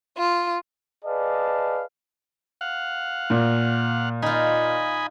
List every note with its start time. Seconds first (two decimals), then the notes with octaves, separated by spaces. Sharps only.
0.18 F4
1.05 G#4 B4 D5 D#5 F5 A5
2.61 F5 F#5
3.30 A#2
4.22 D#4 F4 D#5 G#5 B5